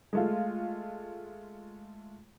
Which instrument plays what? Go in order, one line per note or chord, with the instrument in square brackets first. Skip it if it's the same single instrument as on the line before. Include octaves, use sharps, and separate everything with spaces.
[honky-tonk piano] G#3 A3 F4